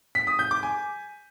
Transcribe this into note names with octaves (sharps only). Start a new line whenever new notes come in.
B6
D#6
G6
D6
G#5